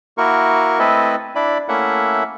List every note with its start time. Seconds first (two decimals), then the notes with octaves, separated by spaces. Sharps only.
0.18 A#3 E4 F#4 A#4 C#6
0.79 A3 C4 E4 A4 B4 D#5
1.35 D4 E4 D5 B5
1.68 A3 A#3 C#4 E4 E5 F#5